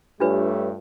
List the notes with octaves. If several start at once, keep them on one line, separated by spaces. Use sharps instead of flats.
G2 G3 A3 D4 F4 G4 B4 C#5